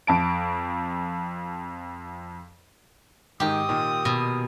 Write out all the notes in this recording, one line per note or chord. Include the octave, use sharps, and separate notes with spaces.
F2 A5 D7
G#2 D#3 C4 G4 D6 D#6
A#2 D#3 A#3
B2